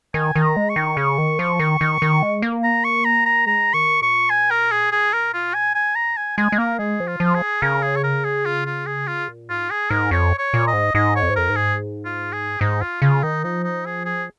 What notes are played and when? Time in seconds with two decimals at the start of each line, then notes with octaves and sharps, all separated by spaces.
0.14 D#3 G#5
0.36 D#3
0.42 A#5
0.56 G#3
0.70 C#6
0.76 D#3
0.97 C#3
1.18 D#3
1.39 F3
1.59 D#3
1.81 D#3
2.02 D#3
2.22 G#3
2.42 A#3
2.64 A#5
2.84 C#6
3.05 A#5
3.26 A#5
3.46 G#3 A#5
3.74 D#3 C#6
4.02 A#2 C#6
4.30 G#5
4.51 A#4
4.71 G#4
4.92 G#4
5.13 A#4
5.34 F4
5.54 G#5
5.75 G#5
5.96 G#2 A#5
6.16 G#3 G#5
6.37 G#3 G#5
6.52 G#3
6.58 A#3 A#4
6.79 G#3 G#4
7.00 F3
7.07 F4
7.20 F3
7.34 G#4
7.62 C#3 A#4
7.83 G#4
7.96 C#5
8.03 A#4
8.25 G#4
8.45 F4
8.66 F4
8.86 G#4
9.07 F4
9.28 A#2
9.49 G#2 F4
9.70 G#4
9.90 G#2 A#4
10.11 F2 C#5
10.39 C#5
10.54 A#2
10.67 D#5
10.73 G#2
10.95 G#2 D#5
11.16 C#5
11.23 F2
11.30 G#2
11.36 F2 A#4
11.49 G#2
11.56 G#4
12.05 F4
12.33 G#4
12.61 G#2 D#4
12.81 F4
13.02 C#3 F4
13.23 D#3 D#4
13.44 F3 D#4
13.64 D#4
13.86 G#4
14.05 G#4